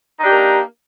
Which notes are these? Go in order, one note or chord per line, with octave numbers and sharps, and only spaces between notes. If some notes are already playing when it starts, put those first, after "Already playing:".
A#3 D4 D#4 G4 A#4